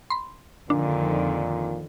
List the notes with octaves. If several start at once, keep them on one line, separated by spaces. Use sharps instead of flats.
B5 C6
F2 A#2 D3 D#3 D4